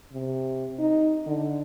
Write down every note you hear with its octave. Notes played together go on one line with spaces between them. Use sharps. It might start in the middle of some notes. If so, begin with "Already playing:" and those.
C3
D#4
D3